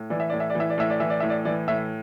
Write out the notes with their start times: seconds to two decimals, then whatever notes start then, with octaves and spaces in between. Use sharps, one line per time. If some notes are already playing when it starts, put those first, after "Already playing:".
Already playing: A2
0.10 E3 D5
0.20 E5
0.30 A2 D5
0.40 E5
0.50 D5
0.55 E3 E5
0.70 D5
0.78 A2 E5
0.90 D5
1.00 E3 E5
1.10 D5
1.20 A2 E5
1.30 D5
1.45 E3 D5
1.68 A2 E5